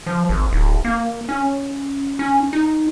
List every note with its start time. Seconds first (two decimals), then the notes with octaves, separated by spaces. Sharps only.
0.07 F3
0.29 G#1
0.53 D1
0.85 A#3
1.29 C#4
2.19 C#4
2.53 D#4